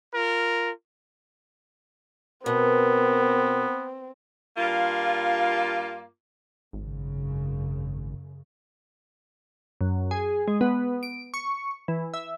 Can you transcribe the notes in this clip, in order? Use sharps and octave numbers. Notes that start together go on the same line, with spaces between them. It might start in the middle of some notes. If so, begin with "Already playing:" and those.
F4 A#4
B2 B3 C4 A#4
G2 A#3 F4
G#1 F#2 C#3
F#2
G#4
G#3
B3
D7
C#6
E3
E5